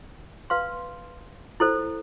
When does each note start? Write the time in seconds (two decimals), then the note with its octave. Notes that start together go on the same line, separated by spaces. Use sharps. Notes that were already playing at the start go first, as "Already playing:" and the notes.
0.50 B4 F5 C6
1.60 E4 A4 C5